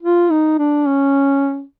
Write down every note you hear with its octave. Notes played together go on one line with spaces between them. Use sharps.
F4
D#4
D4
C#4